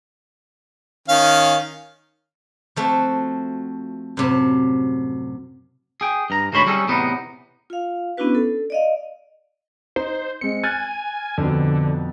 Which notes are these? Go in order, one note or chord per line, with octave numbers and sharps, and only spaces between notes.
D#3 C#4 F5
F3 A3 C4 F#4
F#2 A2 C3
G#4 G5
G2 A#5
D2 G#2 C#4 C5 C#5 B5
G3 C4 C#4 D#4 G#4 A4
E2 A2 C3 B3 D#4
F4 F5
B3 C#4 D4 E4 F#4 B4
A4
D5 D#5 F5
D#4 C5
G#3 C4 C#7
G#5 F6 F#6 A6
F2 B2 D3